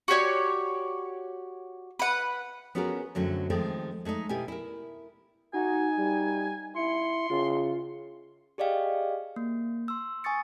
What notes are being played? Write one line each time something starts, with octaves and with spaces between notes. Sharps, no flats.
F#4 G4 C#5 D5
B4 F#5
B3 C#4 F4 F#4 G#4 A#4
F#2 D3 F#3 A3 C4
D#3 F3 G#3 A3 C4
G#3 A3 C#4 D#4
B2 E4 G4 G#5
E4 A#4
D#4 F#4 G#5
G3
E4 C6 C#7
C#3 F4
G4 G#4 D5 D#5 F5 G5
A#3
C6 E6
G#5 C#6 D#6 A6 C#7